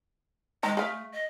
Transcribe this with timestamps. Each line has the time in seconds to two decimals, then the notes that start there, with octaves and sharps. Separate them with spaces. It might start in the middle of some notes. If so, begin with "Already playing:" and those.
0.63 D#3 G#3 A#5
0.77 A3 G#4 F5
1.13 D#5